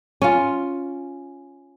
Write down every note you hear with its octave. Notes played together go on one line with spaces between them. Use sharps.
C#4 F4